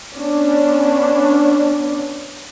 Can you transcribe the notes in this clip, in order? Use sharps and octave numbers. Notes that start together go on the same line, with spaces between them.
B3 C#4 D4